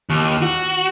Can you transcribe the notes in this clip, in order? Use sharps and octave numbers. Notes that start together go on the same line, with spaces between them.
D#2
F#4